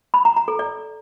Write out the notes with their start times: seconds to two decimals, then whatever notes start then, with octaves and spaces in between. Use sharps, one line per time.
0.14 B5
0.25 A#5
0.36 A#5
0.48 A4
0.59 D5